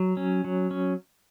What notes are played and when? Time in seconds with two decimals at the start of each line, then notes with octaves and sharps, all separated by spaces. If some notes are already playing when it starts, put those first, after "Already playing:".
Already playing: F#3
0.17 C#4
0.44 F#3
0.71 C#4